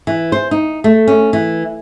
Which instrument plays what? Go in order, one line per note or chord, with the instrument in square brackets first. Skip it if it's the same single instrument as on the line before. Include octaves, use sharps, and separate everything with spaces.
[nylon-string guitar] E3
C5
D#4
A3
C#4
E3